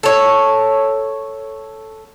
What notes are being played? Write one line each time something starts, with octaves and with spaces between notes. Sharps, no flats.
A4 C#5